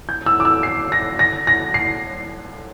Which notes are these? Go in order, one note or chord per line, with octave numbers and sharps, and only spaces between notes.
G6
E6
D6
E6
C7
A#6
A#6
A#6
C7